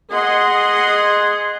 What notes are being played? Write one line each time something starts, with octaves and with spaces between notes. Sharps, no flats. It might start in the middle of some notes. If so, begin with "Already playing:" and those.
G#4 D#5 F#5 C6